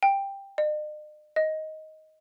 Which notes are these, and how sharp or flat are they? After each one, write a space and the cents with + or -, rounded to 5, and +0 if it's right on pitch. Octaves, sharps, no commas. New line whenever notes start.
G5 +10
D#5 -45
D#5 +10